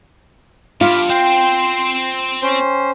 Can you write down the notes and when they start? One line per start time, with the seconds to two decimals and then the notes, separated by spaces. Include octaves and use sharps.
0.81 G2 F4 F5 B5 D6
1.10 C4 G5 C6
2.42 C#4 C5